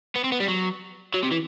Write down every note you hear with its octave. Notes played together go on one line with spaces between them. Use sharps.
B3
C4
B3
G3
F#3
F#3
C3
E3